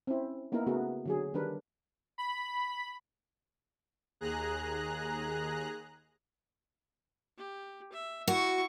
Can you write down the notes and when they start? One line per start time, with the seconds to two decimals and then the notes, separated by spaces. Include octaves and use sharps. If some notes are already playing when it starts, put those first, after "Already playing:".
0.07 C4 C#4 E4
0.52 A#3 B3 D#4 E4 A#4
0.67 C#3 A3 B3 F#4 G#4 A#4
1.05 D3 F#3 G#4
1.34 D#3 G3 D4 A#4 B4
2.18 B5
4.21 D#2 G#4 A#5 F#6
7.38 G4
7.92 E5
8.28 E4 F#4 C#6